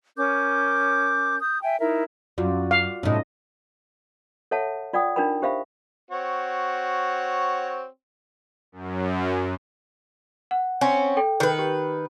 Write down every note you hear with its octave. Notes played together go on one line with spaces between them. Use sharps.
C#4 A#4 D6 G6
D#6 G6
E5 G5 G#5
D#4 E4 A#4 E5
F#2 F4 F#4 D5
F5
A2 C3 C#4 D#4 D#5
A4 C#5 E5 F#5 A5
F4 D5 F#5 G5 D#6
D4 D#4 F4 A#4 G5 B5
G4 C5 E5 F5 B5
C4 F#4 C#5
F#2
F#5
C4 C#4
A4 G5
D#3 B4
G4